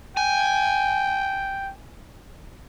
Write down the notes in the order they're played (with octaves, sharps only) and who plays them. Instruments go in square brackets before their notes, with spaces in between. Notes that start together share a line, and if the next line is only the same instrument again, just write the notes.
[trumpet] G5 [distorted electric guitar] G#5